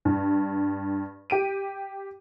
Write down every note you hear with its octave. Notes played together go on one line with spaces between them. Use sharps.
G2
G4 D7 D#7